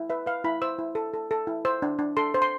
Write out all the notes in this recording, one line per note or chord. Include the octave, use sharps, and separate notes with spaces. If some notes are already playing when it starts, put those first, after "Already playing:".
Already playing: E4
B4 E5
B4 F5
E4 B5
C5 E6
E4
A4
A4
A4
E4
C5 E6
D4
D4
A4 C6
C5
C6